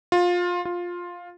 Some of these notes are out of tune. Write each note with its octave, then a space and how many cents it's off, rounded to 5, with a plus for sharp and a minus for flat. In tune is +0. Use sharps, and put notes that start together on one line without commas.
F4 +20
F4 +10